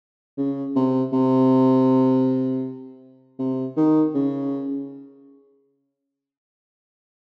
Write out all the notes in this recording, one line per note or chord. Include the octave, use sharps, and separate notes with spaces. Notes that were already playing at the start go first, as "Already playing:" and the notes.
C#3
C3
C3
C3
D#3
C#3